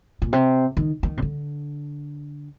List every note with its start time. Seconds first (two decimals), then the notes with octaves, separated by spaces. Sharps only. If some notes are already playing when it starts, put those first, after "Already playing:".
0.22 A#2
0.33 C3
0.77 D#3
1.03 D#3
1.17 C3
1.22 D3